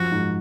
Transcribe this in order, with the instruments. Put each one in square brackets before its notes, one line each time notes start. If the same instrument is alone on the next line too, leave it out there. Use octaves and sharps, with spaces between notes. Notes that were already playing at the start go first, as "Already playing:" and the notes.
Already playing: [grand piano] F#2 F3 [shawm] F#4
[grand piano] G#2